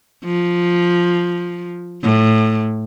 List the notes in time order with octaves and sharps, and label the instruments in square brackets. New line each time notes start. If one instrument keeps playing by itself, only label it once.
[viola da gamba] F3
A2